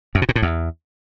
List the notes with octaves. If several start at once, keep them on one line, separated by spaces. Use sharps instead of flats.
F#2
B2
A#2
A2
E2